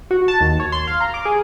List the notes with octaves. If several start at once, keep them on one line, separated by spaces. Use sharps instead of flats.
F#4
A5
D#2
C#5
C6
F5
A#5
D6
G#4